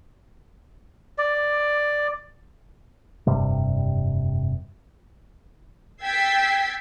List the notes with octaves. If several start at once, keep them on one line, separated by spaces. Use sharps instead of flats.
D5
F1 G2 C3 G3
G5 E6 G#6 A6 B6 C7